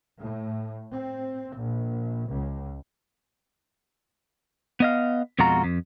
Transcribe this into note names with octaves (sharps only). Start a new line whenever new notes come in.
A2
C4
A#1
C#2
B3 D#5 F5
F2 B2 G#3 F4 F#4 A#5
F2